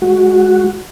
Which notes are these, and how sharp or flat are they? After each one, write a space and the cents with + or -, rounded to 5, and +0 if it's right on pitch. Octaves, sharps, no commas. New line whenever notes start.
G#3 +0 F#4 +0